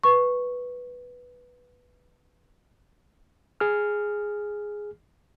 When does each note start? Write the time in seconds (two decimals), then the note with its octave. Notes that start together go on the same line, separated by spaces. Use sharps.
0.03 B4 C#6
3.60 G#4 F6